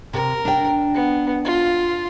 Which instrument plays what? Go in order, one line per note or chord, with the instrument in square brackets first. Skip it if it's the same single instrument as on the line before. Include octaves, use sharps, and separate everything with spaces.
[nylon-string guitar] C3 [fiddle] A#4
[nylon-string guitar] D4 G5
[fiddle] B3
F4